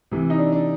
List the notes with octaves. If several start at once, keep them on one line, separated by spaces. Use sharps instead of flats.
C3 E3
D#4
D4
D4